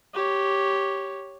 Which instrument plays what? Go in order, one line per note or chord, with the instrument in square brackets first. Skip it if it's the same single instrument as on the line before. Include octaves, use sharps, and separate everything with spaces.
[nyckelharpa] G4 C#5